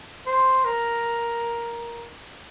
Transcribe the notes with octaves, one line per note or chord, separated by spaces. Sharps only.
C5
A#4